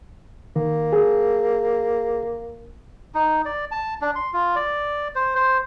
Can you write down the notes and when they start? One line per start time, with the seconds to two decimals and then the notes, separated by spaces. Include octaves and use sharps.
0.56 D#3 A#3
0.93 G#4
3.15 D#4
3.45 D5
3.71 A5
4.01 D4
4.16 C6
4.33 F4
4.56 D5
5.15 C5
5.35 C5